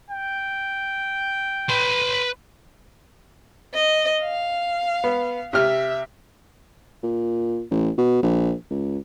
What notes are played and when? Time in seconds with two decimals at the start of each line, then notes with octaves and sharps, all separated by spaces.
0.10 G5
1.69 B4 C6
3.74 D#5
4.22 F5
5.04 B3
5.53 C3 E5 F6
7.03 A#2
7.71 A1
7.98 B2
8.22 A#1
8.71 C#2